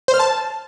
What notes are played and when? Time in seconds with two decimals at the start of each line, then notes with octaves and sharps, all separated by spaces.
0.08 C5
0.14 F6
0.19 A5